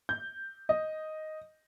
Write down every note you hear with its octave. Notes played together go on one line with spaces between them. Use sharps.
G6
D#5